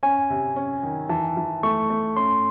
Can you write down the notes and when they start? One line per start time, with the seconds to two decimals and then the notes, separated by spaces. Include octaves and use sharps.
0.03 C#4 G#5
0.30 C3
0.56 C#4
0.83 D#3
1.09 E3 A5
1.37 E3
1.63 A3 C#6
1.90 A3
2.16 C#4 C6